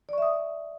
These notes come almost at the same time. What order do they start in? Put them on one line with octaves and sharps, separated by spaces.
D5 C#6 E5 D#6